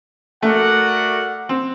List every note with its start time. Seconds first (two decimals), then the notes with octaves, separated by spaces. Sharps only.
0.42 A3 F#4 A#4 D5 F#5
1.49 C4